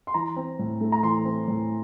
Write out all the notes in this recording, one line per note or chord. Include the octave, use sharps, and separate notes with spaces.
C6
E3 A#5
C4
A2
A3
A#5
E3 C6
C4
A2